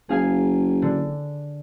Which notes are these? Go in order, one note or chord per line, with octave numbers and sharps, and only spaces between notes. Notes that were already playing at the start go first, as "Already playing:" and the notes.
F#1 G#4 F5 G#5
D3